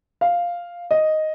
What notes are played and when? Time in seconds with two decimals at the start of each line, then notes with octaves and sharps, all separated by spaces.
0.21 F5
0.91 D#5